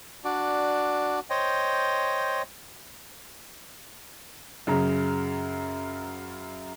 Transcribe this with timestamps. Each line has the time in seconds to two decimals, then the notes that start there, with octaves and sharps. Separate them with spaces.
0.24 D4 F#4 D5
1.30 C5 C#5 D#5 G5
4.67 F#2 C#3 A#5